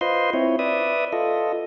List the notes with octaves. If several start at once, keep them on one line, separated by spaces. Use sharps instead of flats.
F4 B4 C5 D#5 C6
C4 E4 C#5
B4 D5 E5 D#6
F4 A4 D#5